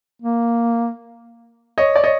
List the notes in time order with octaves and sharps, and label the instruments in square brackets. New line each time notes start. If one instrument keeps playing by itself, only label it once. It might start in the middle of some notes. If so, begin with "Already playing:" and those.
[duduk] A#3
[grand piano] C#5 D#5
D5
C#5 D#5